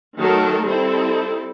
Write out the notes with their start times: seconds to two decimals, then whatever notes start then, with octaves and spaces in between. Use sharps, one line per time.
0.20 D#3 F#3 A3 A4 A#4
0.64 G3 C4 E4 A4